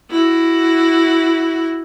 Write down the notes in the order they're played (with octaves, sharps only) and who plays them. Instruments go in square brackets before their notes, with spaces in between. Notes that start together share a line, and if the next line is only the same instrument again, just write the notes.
[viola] E4 F#4